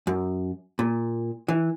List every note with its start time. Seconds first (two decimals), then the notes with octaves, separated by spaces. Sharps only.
0.07 F#2
0.79 A#2
1.48 E3